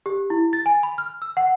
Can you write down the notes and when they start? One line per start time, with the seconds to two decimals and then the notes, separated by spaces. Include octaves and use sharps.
0.06 G4
0.30 E4
0.53 A6
0.66 G#5
0.83 B5
0.98 F6
1.22 E6
1.37 F#5